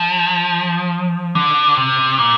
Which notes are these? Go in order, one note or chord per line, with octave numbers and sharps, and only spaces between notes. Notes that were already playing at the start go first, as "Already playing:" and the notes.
Already playing: F3
D3
C3
A#2